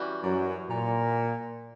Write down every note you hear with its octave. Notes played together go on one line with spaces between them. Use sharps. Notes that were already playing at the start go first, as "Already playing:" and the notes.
Already playing: E3 G3 C#4 F#4
F#2 F#3
A#2